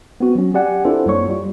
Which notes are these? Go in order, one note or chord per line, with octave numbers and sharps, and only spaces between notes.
B3 C4 F#4
F#3 C#4
G4 D5 F#5 G#5
C4 D4 E4 F4 A4 C5
F#2 G3 A#3 C#5 C#6
G3 F4